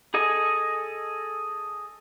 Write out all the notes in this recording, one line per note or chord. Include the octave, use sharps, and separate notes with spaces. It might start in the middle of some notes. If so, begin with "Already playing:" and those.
G#4 A4 D#5 G#5